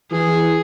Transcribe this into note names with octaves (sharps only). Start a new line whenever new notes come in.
E3 G#4